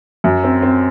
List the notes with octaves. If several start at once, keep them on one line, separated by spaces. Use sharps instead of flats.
F#2
C4
C4